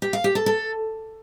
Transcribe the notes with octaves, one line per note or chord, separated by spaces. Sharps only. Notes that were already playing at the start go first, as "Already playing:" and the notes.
G4
F5
G4
A4
A4